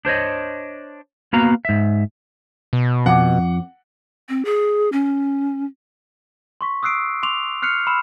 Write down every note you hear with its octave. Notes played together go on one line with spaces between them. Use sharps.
D4 C5 C#5 D#5
A#3 B3 F#4 F5 A#5
G#2 E5
B2
F2 F#5 D6
C4
G#4
C#4
C6 C#6 B6
D#6 E6 F#6 C7 D7
C6 D6 F7
F6 F#6 C7 C#7 F7
B5 C6 E6 F6 E7